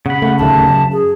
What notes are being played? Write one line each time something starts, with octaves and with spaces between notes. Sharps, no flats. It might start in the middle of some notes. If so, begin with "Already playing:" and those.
C#3 F#5 B5
A3 F#5
D1 D#2 A3 A5
F#2
G#4